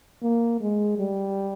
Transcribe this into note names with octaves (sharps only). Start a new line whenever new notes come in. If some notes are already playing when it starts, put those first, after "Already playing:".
A#3
G#3
G3